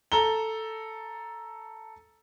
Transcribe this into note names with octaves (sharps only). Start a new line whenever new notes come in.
A4 A#5 G7